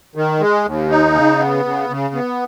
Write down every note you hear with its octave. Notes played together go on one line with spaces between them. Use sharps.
D#3
G#3
D#2
D#4
C#3
B3
C#3
C#3
B3